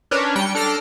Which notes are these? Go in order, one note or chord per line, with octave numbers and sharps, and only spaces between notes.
C#4 D4 A#4 B4 C#5
G3 G5 C#7
D4 A4 F6 A#6 C7 D7